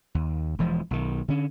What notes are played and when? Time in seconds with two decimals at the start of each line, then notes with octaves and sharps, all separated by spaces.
0.15 D#2
0.59 E1 E3 F3 G#3
0.91 B1 D#3
1.28 D3 C#4